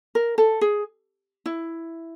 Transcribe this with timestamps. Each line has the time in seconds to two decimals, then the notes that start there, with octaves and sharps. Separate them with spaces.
0.15 A#4
0.38 A4
0.61 G#4
1.46 E4